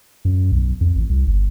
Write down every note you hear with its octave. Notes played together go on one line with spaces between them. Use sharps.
F#2
B1
F2
A1
C2
G1